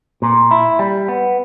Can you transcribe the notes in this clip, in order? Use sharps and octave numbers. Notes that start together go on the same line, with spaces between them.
A#2
E4
G3
B3